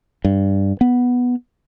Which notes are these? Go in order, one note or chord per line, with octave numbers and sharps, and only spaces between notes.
G2
B3